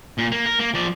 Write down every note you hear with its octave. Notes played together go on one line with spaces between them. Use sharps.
A#2
A#3
A#4
A#3
F3 D5